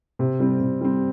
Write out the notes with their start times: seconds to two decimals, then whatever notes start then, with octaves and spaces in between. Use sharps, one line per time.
0.19 C3
0.40 G3 C4
0.60 C3
0.81 G3 C4